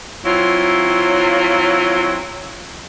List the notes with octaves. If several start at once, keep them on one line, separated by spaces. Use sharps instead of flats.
F#3 C4 E4 F4